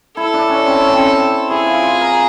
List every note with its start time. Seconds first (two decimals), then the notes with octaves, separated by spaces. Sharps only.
0.17 E4 A4
0.34 D4
0.49 C#4
0.67 C4
0.81 C#4
0.95 C4
1.50 E4 G#4
1.66 F4
1.83 F4
2.01 A#4